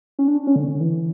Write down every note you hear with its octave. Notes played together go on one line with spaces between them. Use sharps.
C#4
D4
C#4
D3
D3
E3